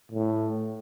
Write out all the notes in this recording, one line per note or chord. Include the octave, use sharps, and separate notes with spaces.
A2